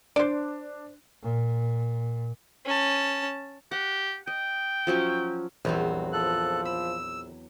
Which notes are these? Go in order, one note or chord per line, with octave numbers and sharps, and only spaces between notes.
D4 C5 D5
A#2
C#4 A5
G4 F#5
D#5 G5
F3 F#3 C#4
A#1 E2 F#3 G3 C4
F3 A4 F#6
B5 E6